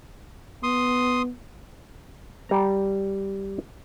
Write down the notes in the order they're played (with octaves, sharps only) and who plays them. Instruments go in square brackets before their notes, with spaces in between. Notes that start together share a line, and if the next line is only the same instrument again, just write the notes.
[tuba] B3 [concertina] C6 D#6
[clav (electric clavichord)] G3 A#5